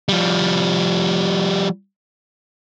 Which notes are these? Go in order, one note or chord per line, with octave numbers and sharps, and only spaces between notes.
F3 G3